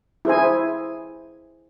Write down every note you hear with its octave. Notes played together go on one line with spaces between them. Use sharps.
E4 G#4 C5 G#5